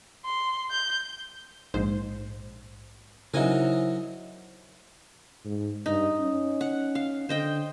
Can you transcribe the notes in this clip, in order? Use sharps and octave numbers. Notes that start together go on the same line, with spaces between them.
C6
G6
A#1 G#2 C5
C#3 F#3 D#4 E4 A#4 C5 E5 G#5
G#2
G2 D#4
C#4
F#5
F5
D3 C5 D#5 G5